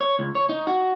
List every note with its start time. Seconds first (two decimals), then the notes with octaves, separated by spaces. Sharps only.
0.01 C#5
0.19 C#2
0.35 C#5
0.49 D#4
0.67 F#4